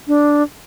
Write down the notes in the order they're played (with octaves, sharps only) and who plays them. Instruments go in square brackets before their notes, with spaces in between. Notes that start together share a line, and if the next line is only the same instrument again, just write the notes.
[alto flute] D4